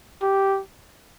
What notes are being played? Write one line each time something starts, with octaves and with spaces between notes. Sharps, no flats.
G4